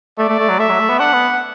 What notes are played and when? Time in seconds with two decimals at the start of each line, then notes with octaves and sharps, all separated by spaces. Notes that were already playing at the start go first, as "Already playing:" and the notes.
0.18 A3 D5
0.29 A3
0.39 A3
0.49 F#3
0.59 A3 E5
0.70 F#3
0.79 A3
0.89 B3
0.99 D4 F#5
1.13 B3